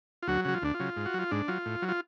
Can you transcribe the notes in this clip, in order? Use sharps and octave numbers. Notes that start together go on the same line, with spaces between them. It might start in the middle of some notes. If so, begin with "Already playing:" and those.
F4
D2 F#3 F#4
C#3 F#3 F#4
F4
D2 D4
F4
C#3 F#3
G#2
F#4
F#3 F4
G#2 D4
F#3 F4
A2
F#3
F4